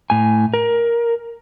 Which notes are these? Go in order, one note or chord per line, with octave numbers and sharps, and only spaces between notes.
A2 G#5
A#4